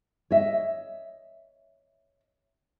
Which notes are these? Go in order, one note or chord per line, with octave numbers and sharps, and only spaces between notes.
C#5 D#5 E5